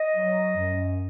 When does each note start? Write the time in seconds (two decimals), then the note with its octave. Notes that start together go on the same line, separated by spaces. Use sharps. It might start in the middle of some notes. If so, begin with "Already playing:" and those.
Already playing: D#5
0.15 F#3
0.57 F#2